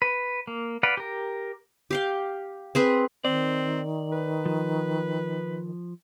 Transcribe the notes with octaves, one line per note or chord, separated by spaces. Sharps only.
B4
A#3
B4 D5 F5 F#5
G4 A#4
G4 F5 G5
C4 G#4 B4
D#3 C4 D5
B4
F3